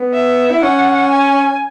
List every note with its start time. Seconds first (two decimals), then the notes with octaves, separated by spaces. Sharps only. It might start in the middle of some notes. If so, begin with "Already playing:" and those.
Already playing: B3
0.14 E5
0.51 E4
0.62 C#4 F#5
1.11 G#5